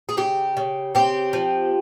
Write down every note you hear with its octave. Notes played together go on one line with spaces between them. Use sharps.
G#4
C#3 G4
C#3
C4 G4
F3